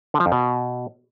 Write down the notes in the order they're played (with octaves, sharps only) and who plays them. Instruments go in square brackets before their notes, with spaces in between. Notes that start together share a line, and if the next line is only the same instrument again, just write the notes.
[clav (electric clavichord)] D3
F3
F2
B2